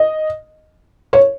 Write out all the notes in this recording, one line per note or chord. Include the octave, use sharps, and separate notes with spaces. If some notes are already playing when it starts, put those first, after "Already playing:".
Already playing: D#5
C#5